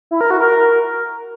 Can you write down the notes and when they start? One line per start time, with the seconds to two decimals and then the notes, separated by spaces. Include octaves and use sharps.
0.11 E4
0.21 A#4
0.31 F#4
0.40 A#4